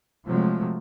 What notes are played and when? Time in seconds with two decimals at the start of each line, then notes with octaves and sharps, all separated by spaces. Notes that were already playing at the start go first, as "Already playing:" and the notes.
0.24 C3 F3 F#3 G#3 A3